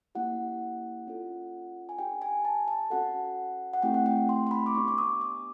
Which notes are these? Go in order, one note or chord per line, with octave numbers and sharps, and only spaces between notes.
A#3 C#4 E4 G4 F#5
C#4 F4 A4
G#5
D4 G4 G5
G#5
A5
A5
C#4 F#4 A4 F#5
F#5
A3 C4 E4 G4 G5
F#5
G5
C6
C6
B5
D6
B3 D4 G4 C#6
D6
D#6
D#6